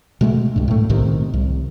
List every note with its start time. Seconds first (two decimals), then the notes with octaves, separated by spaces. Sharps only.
0.21 B2 G#3 A3
0.56 C#2 G2
0.68 A2 A3
0.89 B1 A2 C3 D#3
1.34 C2